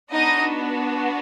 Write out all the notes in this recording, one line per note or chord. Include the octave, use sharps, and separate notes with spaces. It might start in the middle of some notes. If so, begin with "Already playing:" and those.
B3 D4 D#4 F#4 D#5